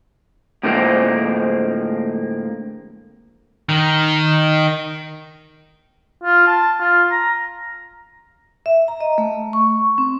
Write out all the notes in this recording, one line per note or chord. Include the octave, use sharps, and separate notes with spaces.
A2 D3 F3 G#3 A#3 C4
D#3
F4
A5
F4
A#5
E5
A#5
D#5
A3
C#6
C4